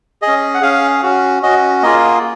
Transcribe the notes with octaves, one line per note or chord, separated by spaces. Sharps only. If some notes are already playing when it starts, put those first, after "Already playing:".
G#4 D#5
C#4
F#5
C#4 G#4 F5
C#4 F#4
C#4 F#4 D#5
A#3 F4 G#4 D#5